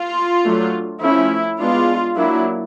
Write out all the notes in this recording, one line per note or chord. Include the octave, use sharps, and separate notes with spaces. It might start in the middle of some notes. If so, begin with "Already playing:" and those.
Already playing: F4
F#3 A3 D4
F3 A3 C#4 E4
G#3 B3 D4 F4
F#3 A#3 D4 E4